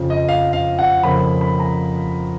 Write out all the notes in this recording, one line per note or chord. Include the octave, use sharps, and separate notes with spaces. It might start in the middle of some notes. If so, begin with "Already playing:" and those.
Already playing: F2 C#3 F3
D#5
F5
F5
F#5
F2 C#3 F3 A#3 B5
B5
A#5